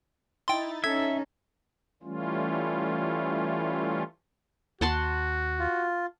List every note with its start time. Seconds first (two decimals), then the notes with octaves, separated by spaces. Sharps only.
0.48 D#4 E4 G5 C6 A6
0.84 C#4 D#4 A4 E5 G#6
2.03 E3 G3 A3 C#4 F4
4.81 D#2 F#4 F#5 A5 C6
5.59 F4